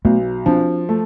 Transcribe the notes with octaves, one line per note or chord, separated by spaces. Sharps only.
B1 A3 B3
F3 C4 D4
A3